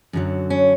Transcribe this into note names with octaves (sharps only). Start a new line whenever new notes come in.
F#2 D3 F#3
C#4